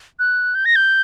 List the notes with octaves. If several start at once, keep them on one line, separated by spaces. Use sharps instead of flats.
F#6
G6
A#6
G6